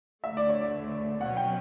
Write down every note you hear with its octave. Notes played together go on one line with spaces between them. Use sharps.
D2 D3 A3 E5
D5
C#5
D5
B2 F#3 C#4 F#5
G5